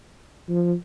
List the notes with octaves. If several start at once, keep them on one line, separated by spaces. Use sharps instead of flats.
F3